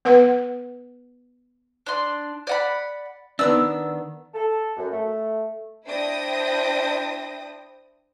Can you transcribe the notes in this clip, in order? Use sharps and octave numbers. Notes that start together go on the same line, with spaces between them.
B3 B4 F#5
D4 C6
D5 F#5 B5
D#3 B3 D4 E6
A4
F#2
A3
D4 E4 C5 G5 D#6 A#6